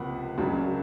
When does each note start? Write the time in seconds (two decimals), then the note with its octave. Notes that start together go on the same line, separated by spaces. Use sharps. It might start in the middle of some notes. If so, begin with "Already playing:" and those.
Already playing: C#2 C3 F3 A#3 F#5 B5
0.38 C#2 C#3 F#3 A#3 D4